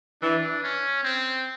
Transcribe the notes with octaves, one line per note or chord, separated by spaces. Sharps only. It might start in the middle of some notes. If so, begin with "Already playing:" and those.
E3 D4
C#4
C4